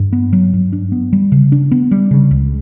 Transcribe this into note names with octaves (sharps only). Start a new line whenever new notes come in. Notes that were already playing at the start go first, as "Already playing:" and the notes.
Already playing: G2
B3
F#3
G2
D4
B3
G3
C#3
D4
B3
G3
C#3
C#2